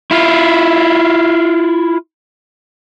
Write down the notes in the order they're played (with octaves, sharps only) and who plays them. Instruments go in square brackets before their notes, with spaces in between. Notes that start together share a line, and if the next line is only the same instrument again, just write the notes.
[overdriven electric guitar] E4 F4